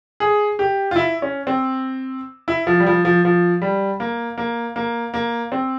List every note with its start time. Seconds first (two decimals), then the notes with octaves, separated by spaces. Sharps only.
0.20 G#4
0.59 G4
0.91 F4
0.96 E4
1.22 C#4
1.47 C4
2.48 E4
2.67 F3
2.80 G3
2.86 F3
3.05 F3
3.25 F3
3.62 G3
4.00 A#3
4.38 A#3
4.76 A#3
5.14 A#3
5.52 C4